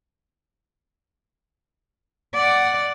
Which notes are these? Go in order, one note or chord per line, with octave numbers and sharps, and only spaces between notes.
D5 F#5